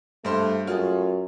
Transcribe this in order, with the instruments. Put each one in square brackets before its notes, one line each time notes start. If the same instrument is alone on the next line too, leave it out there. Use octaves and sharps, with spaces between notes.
[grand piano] G2 C5 C6 [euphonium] A3
[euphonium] F#2 [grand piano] A3 F4 G#4